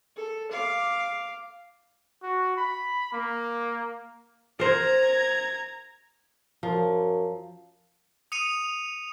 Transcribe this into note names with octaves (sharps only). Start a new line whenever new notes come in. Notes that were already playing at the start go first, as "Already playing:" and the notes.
A4
F5 D6
F#4
B5
A#3
A#4 C5 A#5 G#6
F#2 F3
D#6 C#7 D#7 F7